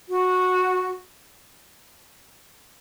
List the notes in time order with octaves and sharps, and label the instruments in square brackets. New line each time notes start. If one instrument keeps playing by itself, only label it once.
[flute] F#4